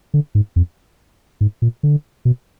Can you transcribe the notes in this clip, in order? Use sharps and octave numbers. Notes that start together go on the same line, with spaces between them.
D3
G#2
F2
G#2
A#2
D3
B2